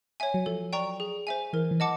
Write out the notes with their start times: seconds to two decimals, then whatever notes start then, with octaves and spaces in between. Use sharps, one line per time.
0.20 C#5 E5 G#5
0.34 F#3
0.46 F3 A4
0.73 D5 G5 A#5 C#6
1.00 G#4
1.27 C5 E5 G#5
1.53 E3 A#4
1.71 E3
1.80 D#5 F#5 A5 D6